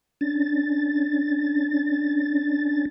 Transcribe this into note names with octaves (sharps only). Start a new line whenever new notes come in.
C#4 D4 A6